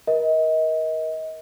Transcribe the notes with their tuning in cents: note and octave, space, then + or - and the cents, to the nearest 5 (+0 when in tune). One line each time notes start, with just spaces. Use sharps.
A#4 +30 D#5 +30